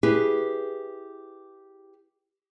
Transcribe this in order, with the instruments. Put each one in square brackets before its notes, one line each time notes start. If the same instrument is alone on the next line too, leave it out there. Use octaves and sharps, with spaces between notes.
[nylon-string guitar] E4 G4 G#4 B4